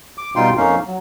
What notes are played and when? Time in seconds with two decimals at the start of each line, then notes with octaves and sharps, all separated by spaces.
0.18 D6
0.36 B2 G3 D#4 F4 G5 C6
0.57 F2 A#3 C#4 D#4 F5
0.87 F#3